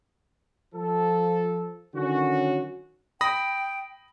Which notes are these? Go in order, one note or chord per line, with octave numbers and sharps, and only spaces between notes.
F3 A4
D3 D#3 F#3 C#4 F#4
G5 B5 D#6 A#6